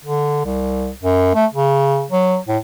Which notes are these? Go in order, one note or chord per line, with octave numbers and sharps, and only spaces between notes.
D3
C2
F#2
A3
C#3
F#3
A2